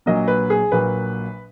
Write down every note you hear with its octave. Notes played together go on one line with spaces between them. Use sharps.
A#1 A#2 F#3 A#3 D#5
B4
G#4
A#1 A#2 F#3 A#3 B4